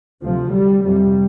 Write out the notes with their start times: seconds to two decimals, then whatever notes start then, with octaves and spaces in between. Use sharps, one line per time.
0.22 D2 C3 F3
0.54 G3
0.84 F2 C3 G3